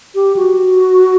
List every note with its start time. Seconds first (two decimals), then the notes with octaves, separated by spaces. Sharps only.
0.15 G4
0.36 F#4